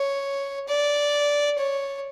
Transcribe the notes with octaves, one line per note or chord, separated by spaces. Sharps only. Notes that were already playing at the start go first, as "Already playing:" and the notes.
Already playing: C#5
D5
C#5